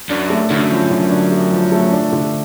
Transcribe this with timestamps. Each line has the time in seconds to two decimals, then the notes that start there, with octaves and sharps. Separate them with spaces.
0.09 F#2 D4
0.30 A3
0.50 F#2 D3
0.71 F3
0.91 D3
1.11 D4
1.31 A3
1.52 F3
1.72 A3
1.92 D4
2.13 D3